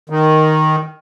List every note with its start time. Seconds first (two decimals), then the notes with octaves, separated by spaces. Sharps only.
0.10 D#3